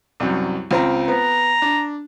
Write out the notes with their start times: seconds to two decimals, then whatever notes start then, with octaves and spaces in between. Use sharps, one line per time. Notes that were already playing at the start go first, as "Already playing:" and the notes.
0.20 C2 F#2
0.71 C#2 C4 A#5
1.08 B3 A#5
1.62 D4